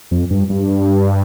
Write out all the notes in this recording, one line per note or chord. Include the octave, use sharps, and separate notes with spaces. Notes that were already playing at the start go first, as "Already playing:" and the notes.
F2
G2
G2